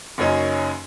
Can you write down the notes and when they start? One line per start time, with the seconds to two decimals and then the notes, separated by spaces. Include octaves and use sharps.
0.18 F#1 F#2 C#4 D#4